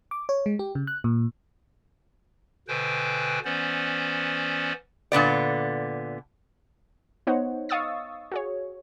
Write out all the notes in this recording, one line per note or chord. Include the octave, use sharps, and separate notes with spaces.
D6
C#5
G#3
G4
C#3
F#6
A#2
B2 D3 B4 C5 G5 G#5
E3 B3 C#4 C5 D5
A#2 D3 B3 D5
B3 D#4 C5 C#5 D#5 F#5
D#5 F5 C#6 D#6 E6 A6
F#4 G#4 C#5